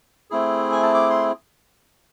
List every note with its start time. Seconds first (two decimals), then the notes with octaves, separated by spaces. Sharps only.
0.31 A3 C4 E4 G#4
0.72 G#5
0.83 A5
0.94 D6
1.10 C6